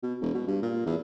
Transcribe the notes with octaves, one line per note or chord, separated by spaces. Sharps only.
B2
E1
B2
G2
A#2
E2